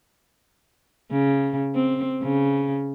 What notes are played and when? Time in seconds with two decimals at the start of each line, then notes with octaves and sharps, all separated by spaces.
1.11 C#3
1.75 C4
2.23 C#3